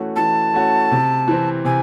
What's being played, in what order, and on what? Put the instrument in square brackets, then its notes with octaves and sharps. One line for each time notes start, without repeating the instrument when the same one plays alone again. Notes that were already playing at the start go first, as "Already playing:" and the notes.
Already playing: [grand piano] E3 A3 C#4 F#4
[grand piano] E3 [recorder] A5
[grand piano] A3 C#4 F#4
C3
E3 C4
[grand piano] C3 [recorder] G#5